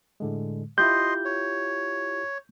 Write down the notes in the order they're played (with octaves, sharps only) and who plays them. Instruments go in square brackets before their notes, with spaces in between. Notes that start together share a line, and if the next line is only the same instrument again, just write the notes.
[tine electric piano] A2 D3 G#3
[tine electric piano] E4 F4 G4 [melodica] D#5 C6 [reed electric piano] G6
[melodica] C#5